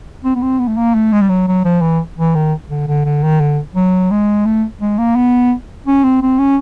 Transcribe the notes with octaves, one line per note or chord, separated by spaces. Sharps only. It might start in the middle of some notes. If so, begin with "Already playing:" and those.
C4
B3
C4
B3
A3
A#3
A3
G#3
G3
F#3
F#3
F3
E3
E3
D#3
D3
D3
D3
D#3
D3
F#3
G#3
A3
G#3
A#3
B3
C#4
C4
C4
C#4